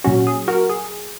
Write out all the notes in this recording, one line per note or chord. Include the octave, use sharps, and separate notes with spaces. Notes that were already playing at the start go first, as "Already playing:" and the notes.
A#2 F#3 C#4 F#4
G#4
F#4 A#4
G#4